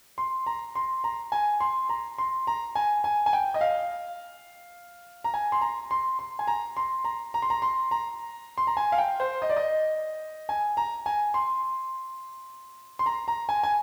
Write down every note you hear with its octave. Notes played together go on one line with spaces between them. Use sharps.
C6
A#5
C6
A#5
G#5
C6
A#5
C6
A#5
G#5
G#5
G#5
G5
D#5
F5
A#5
G#5
C6
A#5
C6
C6
G#5
A#5
C6
A#5
A#5
C6
A#5
C6
A#5
C6
A#5
G#5
F5
G5
C5
D#5
D5
D#5
G#5
A#5
G#5
C6
C6
A#5
A#5
G#5
G#5